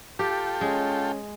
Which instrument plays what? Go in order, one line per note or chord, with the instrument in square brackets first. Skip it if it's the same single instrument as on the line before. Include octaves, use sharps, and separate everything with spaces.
[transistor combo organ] F4 A4 G5 [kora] G4
[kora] G#3 [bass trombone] C#4